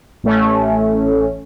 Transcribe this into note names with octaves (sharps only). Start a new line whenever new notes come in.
A1 A3 C#4